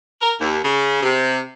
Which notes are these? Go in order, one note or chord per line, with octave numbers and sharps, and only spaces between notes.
A#4
D#2
C#3
C3